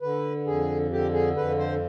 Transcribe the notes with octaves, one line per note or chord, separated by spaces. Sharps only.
D3 B4
F2 G#4
D3 G4
G#4
F2 B4
C5